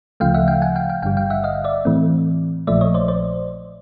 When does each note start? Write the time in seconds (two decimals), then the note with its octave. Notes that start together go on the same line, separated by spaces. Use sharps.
0.20 D2 C#3 F3 A3 F5 G5
0.34 E5 F#5
0.48 F5 G5
0.62 F#5 G#5
0.76 F5 G5
0.89 F5 G5
1.02 G#1 G2 D3 G3 F5 G5
1.17 F5 G5
1.30 E5 F#5
1.44 D#5 F5
1.64 D5 E5
1.85 A2 E3 A3 C4
2.67 A#1 A#2 F3 A3 D5 E5
2.81 C#5 D#5
2.94 C5 D5
3.08 C5 D5